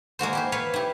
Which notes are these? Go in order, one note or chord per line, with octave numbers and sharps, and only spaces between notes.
G#3 A#3 F#4 C5
E4 G4 C5
B4 C#5 F5
E4 G4